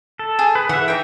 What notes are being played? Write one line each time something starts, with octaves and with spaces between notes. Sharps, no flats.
A4
G#4
B4
E3 E5 F#5
D#4 G5